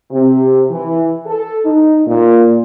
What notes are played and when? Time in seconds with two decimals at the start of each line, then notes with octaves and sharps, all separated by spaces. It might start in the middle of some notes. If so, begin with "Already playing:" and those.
0.11 C3
0.70 E3
1.26 A4
1.65 D#4
2.06 A#2